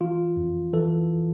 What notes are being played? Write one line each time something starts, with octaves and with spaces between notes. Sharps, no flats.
E3 F4
F2
E3 A4